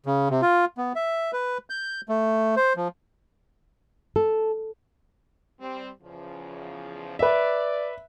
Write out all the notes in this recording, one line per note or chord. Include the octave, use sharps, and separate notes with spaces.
C#3
C3
F4
B3
E5
B4
G6
A3
C5
F3
A4
G3 C4
E2 C#3 F3
B4 D5 E5